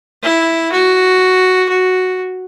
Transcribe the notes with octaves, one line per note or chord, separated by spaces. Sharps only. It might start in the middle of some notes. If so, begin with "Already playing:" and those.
E4
F#4
F#4